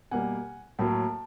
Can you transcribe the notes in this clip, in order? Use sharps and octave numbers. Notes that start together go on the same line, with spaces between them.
B2 G3 A#3 F#5 G#5
A2 F#3 A#3 G5 A5